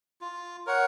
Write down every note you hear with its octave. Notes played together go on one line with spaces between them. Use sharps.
F4
A#4 C#5 F#5